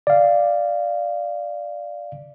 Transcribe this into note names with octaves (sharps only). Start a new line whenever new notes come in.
D5 F5